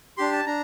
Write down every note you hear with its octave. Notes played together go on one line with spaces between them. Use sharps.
D4 G4 C6
A5
D4 A#5